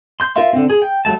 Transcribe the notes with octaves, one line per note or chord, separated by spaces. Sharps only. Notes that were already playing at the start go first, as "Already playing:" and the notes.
C6 G6
F4 A#4 E5 F5 C6
D3 C4
G#4
G5
F#3 G3 A3 A5